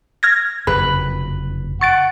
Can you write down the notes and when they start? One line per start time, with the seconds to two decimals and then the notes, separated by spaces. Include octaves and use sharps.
0.23 F6 G#6 A#6
0.67 F#1 F2 C3 B4
1.81 F#5 C#6 A6 D7